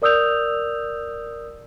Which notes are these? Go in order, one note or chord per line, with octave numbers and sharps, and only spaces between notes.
A#4 D5 D#6 E6 G6 F7